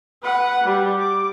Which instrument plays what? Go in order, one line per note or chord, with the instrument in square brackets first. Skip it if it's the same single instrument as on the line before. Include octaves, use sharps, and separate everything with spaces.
[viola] B4 F#5
G3
D6